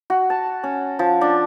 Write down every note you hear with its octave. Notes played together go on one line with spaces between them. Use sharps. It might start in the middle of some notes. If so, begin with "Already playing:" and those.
F#4
A5
C#4
F3
D4